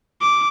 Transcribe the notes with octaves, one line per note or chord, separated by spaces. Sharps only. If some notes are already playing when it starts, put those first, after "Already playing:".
D6